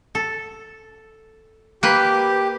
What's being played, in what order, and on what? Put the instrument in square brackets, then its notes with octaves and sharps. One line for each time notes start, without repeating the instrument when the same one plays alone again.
[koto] A4
[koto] A#3 B4 [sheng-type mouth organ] G4